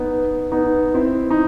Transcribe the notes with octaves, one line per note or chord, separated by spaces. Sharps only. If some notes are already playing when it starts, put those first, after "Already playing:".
Already playing: B3 D#4
B3 D#4
C4 E4
D#4